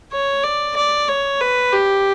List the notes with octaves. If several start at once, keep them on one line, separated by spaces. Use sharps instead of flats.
C#5
D5
D5
C#5
B4
G4